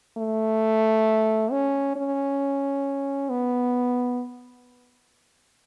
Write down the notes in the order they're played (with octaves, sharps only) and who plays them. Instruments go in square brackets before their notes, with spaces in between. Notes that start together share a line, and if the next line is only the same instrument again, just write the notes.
[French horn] A3
C#4
C#4
B3